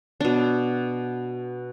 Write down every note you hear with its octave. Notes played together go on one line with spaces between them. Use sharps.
B2 D4